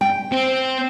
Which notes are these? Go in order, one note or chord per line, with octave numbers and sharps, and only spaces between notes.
G5
C4